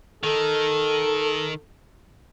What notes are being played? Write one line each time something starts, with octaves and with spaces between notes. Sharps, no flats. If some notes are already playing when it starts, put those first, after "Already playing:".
D#3 A4